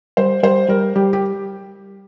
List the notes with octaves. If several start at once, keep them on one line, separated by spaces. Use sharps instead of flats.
G3 C5
G3 C5
G3 A#4
G3 G4
G4